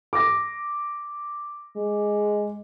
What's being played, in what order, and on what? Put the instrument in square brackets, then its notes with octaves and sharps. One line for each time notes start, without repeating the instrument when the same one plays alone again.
[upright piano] D6 A#6
[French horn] G#3